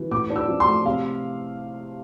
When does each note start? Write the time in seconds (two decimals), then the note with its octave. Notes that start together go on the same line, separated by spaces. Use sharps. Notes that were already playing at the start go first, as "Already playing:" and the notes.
Already playing: E3
0.11 A2 D6
0.30 D4
0.36 E6
0.48 F3
0.60 C6
0.67 A3
0.85 C3 F5